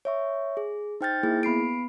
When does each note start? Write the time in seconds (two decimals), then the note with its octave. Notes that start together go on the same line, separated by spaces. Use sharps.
0.05 C#5 E5 C#6
0.57 G#4
1.01 D#4 C5 G5 F6 G6 A6
1.23 A#3 E4 G#4
1.43 B3 B5 C7 D7